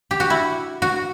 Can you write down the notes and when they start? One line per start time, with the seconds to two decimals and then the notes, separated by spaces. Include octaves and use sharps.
0.11 G4
0.20 F#4
0.30 E4
0.82 F#4